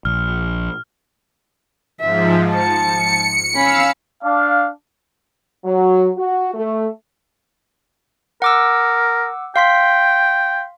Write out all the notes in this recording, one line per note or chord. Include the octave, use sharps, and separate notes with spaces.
A#1 F6
G#2 F3 E5
A5 C#7
C#4 F5 B5 E6
D4 F5
F#3
F#4
A3
A#4 F#5 D6 E6
F5 G5 C6 B6